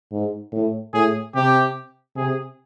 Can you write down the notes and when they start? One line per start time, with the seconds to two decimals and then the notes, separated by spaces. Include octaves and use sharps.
0.12 G#2
0.52 A2
0.94 A2 G#4
1.35 C3 G4
2.16 C3 G#4